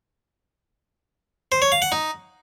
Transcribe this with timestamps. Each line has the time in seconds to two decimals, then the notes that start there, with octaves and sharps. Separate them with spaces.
1.52 C5
1.62 C#5
1.72 F5
1.82 F#5
1.92 D#4